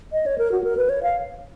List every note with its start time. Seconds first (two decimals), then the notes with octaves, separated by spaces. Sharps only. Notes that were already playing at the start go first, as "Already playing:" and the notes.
0.12 D#5
0.26 C#5
0.38 A#4
0.52 F#4
0.64 A#4
0.77 B4
0.89 C#5
1.03 F5